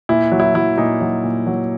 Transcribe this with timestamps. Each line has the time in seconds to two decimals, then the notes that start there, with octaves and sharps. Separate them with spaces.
0.09 A#2 E4
0.32 F#3
0.40 E4
0.55 F#3 E4
0.78 A#2 D#4
1.01 F#3
1.23 A#2
1.47 F#3